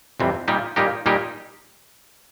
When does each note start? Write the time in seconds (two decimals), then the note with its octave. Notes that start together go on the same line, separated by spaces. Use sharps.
0.20 F2 C3 E3 G3 C4
0.48 A#2 G3 A#3 D#4 G4
0.76 A#2 G3 A#3 D#4 G4
1.06 A#2 G3 A#3 D#4 G4